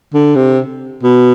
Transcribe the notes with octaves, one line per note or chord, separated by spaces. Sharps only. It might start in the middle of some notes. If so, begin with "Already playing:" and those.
D3
C3
B2